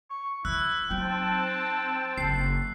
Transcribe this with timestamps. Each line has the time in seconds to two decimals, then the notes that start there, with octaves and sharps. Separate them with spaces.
0.10 C#6
0.45 E3 E4 E6 F#6
0.91 F#3 C4 D#4 G5 A5
2.18 F#1 C7